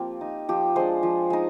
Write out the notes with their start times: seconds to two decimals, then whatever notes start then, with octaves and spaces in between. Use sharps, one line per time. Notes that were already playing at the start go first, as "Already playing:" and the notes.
Already playing: F3 A#3 C4 F4 G4
0.21 D#4
0.49 F3 G4
0.76 G#3 D4 C5
1.03 F3
1.30 G#3 D#4